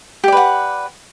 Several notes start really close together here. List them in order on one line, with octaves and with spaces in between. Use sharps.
G4 D5 B4 F#5